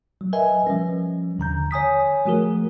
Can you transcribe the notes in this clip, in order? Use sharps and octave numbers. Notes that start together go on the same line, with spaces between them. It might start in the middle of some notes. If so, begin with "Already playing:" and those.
F#3
A#4 B4 D#5 E5 G#5
F3 G3 C#4
D#2 D3 A#5 G6
C#5 G#5 D#6 B6
F3 A3 F#4 G#4 A#4